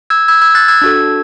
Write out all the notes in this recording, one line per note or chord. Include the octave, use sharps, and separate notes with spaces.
E6 G#6
E6 G#6
E6 G#6
F#6 A6
E6 G#6
D4 F#4 A4